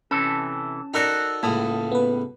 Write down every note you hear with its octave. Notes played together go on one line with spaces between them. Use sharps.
C3 E3 C#4 A4 A5
D#4 F#4 A4 A#4 D5
C#2 A2 A#3 A5 D#6
B3 B4